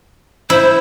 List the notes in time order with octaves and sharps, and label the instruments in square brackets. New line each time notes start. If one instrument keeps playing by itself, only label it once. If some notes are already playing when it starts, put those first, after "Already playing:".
[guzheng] E4 [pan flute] C5